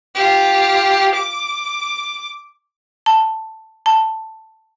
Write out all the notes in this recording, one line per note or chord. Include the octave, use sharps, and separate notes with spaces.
F4 G4
D6
A5
A5